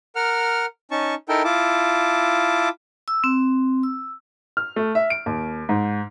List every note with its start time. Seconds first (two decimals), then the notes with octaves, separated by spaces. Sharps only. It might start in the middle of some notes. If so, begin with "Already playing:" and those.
0.16 A#4 F#5 F6
0.91 C#4 D#4 A5 C#6
1.29 D#4 E4 A4 A#4 G5
1.44 E4 F4 A5 D6
3.08 E6
3.24 C4
3.83 E6
4.57 F6
4.76 A3
4.95 E5
5.10 D7
5.26 D#2
5.69 G#2